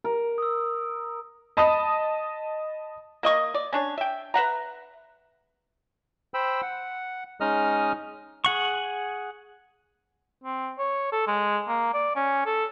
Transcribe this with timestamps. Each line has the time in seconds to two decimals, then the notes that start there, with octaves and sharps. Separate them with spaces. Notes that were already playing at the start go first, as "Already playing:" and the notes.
0.04 A#4
0.38 D#6 E6
1.57 D#5 A5 B5 D#6
3.23 A#3 D#5 C#6
3.54 D5
3.73 C#4 D4 C#5
3.98 E5 G5
4.34 B4 E5 F#5 A#5
6.34 C5 G5 B5 E6
6.62 F#5
7.40 G#3 C#4 D#4 D#5 D#6 F6
8.45 G#4 F#5 C#6
10.44 C4
10.78 C#5
11.12 A4
11.27 G#3
11.68 A#3
11.94 D5
12.16 C#4
12.46 A4